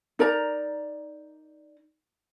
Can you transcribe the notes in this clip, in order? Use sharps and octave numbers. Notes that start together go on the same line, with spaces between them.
D#4 A#4 D5 A#5